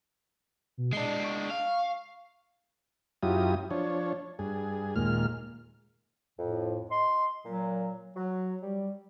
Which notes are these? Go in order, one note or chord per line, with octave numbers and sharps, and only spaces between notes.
B2
G#3 D4 C7
C#6
F5
F#2 F#3 E4 F4 G4 D#6
F3 D4 C#5
G2 G#4
D#2 A#2 G#3 F6
F2 A2
D#5 C6
A#2 F#3
F#3
G3